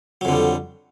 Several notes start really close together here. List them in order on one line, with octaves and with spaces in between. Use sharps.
F#3 F2 D3 G3